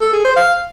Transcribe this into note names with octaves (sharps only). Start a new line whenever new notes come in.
A4
G#4
C5
F5